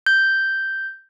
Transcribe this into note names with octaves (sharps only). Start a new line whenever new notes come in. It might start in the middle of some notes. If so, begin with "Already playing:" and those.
G6